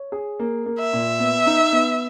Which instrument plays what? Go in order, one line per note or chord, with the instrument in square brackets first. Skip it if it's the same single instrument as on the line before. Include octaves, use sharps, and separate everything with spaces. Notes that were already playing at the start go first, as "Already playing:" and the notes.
Already playing: [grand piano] C#5
G#4
A#3
A#3
[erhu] E5
[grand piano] A#2
B3
D#4
B3